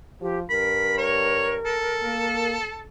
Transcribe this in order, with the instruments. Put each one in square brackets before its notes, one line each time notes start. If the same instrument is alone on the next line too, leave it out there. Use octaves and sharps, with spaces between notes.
[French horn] F3 [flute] G4
[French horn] G2 [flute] A#4 [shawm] B5
[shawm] C#5
A4
[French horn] A#3